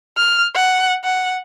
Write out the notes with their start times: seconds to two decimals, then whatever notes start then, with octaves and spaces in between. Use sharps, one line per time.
0.17 F6
0.55 F#5
1.04 F#5